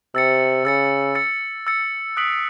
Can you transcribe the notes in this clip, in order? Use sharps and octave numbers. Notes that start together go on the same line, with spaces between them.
C3 E6 A6 C#7
C#3 E6 A6 C#7
E6 A6 C#7
E6 A6 C#7
D#6 F#6 B6 D7 F#7